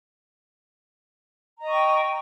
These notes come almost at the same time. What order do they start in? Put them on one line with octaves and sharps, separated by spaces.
A#5 D#5 C#6 G5